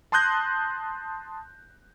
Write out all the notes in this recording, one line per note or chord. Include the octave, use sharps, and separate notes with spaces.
A5 C6 D#6 F#6 G6 A#6